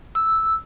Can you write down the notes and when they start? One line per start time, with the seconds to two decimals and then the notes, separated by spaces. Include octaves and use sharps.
0.15 E6